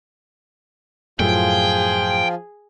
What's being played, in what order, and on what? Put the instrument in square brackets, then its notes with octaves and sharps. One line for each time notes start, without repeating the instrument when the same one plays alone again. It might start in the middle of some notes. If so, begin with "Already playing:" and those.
[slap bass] F#2 A2 [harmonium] F3 F4 [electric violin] G#4 [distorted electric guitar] G5